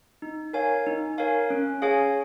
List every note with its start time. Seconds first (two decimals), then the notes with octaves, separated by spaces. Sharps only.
0.22 D#4
0.53 A#4 C#5 F5 G#5
0.87 D#4
1.18 A#4 C#5 F5 G#5
1.50 C#4
1.82 G#4 C#5 F5 G#5